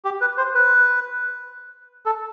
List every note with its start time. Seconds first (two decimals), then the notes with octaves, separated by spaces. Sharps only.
0.05 G4
0.21 B4
0.38 C5
0.54 B4
2.06 A4